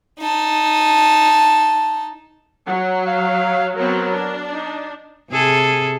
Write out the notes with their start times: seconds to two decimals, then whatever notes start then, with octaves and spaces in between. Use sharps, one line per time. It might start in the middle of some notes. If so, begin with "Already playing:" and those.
0.20 D#4 A5
2.67 F#3 F#5
3.07 F5
3.76 F#3 B3 C4 A#4
4.12 D4
4.54 D#4
5.30 C3 G#4 A4